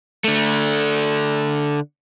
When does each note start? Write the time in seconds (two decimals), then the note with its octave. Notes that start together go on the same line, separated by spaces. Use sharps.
0.24 D3 A3